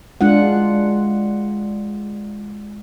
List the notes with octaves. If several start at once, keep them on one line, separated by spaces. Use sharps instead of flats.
G#3 D4 F4 F#5